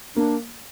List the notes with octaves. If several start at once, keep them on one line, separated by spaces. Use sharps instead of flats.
A#3 D4